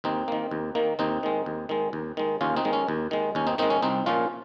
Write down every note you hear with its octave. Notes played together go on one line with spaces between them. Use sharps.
D#2 C4 D#4
D#3 A#3
D#2
D#3 A#3
D#2 C4 D#4
D#3 G#3
D#2
D#3 G#3
D#2
D#3 G#3
D#2 C#4 F4
C4 D#4
D#3 G#3
C#4
D#2
D#3 G#3
D#2 C#4
C4 D#4
D#3 G#3 C4 D#4
C#4
C2 C4 D#4
A#2 F3 C#4 F4